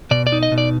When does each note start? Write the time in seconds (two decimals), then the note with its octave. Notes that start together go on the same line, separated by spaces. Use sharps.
0.11 B2 D5
0.27 D5
0.32 D#4
0.43 D#5
0.52 B2
0.58 D5